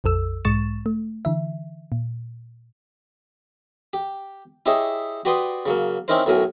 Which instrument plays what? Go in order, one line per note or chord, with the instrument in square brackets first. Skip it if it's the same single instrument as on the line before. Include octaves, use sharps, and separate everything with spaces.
[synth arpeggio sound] A#1 F2 A4 E6
B1 G#2 G#3 C#6 A6 E7
A3
D3 E3 E5
A#2
[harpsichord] G4
E4 G4 G#4 C#5 D#5 E5
F#4 G4 B4 D5 C6 D#6
C#3 F#3 A#3
C4 C#4 D#4 E4 A#4 C5
B1 A2 F#3 A#4 G#5